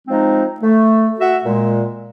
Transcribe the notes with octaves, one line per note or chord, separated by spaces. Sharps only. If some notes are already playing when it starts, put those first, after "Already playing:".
F3 G#3 C4 D#4
A3
F#4 E5
A#2 G#3